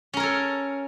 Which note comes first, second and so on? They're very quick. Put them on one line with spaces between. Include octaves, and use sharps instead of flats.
C#4 A#4 C#5 A4